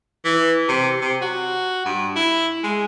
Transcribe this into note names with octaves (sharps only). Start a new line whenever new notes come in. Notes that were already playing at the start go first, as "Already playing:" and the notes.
E3
C3
C3
F#4
G2
E4
G#3